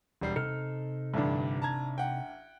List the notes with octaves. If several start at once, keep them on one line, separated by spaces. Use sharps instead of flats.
E1 G3 C7
C3 D#4 A4 F6
A1 G2 D3 D4
A5 A#5 G#6
F#5 G5